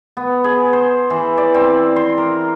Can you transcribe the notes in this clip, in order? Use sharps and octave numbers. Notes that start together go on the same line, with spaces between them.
B3
G#4
C5
E3
D5
C4
C6
A#4